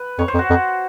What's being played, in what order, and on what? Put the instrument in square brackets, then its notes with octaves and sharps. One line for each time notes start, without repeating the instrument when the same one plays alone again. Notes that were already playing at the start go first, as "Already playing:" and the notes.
Already playing: [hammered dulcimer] B4
[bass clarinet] F2 [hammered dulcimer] C#5
[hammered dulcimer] C5
[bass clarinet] F2
[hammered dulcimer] F#4
[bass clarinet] F2